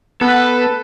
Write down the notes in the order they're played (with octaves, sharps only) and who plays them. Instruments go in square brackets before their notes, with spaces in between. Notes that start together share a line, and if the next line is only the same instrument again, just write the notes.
[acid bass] B3 [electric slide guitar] A4 [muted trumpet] B4